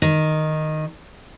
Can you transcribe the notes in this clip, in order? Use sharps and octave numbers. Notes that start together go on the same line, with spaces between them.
D#3